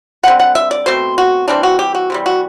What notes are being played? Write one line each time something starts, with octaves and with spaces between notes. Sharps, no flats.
D3 G3 C4 F#5
F#5
E5
D5
B2 A3 C4 C5
F#4
E3 G3 C4 D4
F#4
G4
F#4
C3 E3 G3
F#4